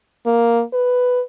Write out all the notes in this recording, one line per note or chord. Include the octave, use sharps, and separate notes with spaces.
A#3
B4